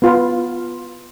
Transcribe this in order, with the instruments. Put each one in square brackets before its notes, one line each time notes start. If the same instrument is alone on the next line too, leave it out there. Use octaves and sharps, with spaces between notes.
[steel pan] B3 F4 B4